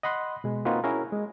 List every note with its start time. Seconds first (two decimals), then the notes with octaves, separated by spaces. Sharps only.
0.03 D#5 F#5 B5 C6 F#6
0.44 B2 G#3
0.65 A#3 C4 D#4 F4 F#4 B4
0.84 C#4 E4 F#4 G#4 A#4
1.12 G#3